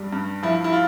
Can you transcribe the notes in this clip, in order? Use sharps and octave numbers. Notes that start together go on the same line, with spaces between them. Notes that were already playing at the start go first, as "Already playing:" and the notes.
Already playing: G2 G3
G2
F3 E4
E4
F4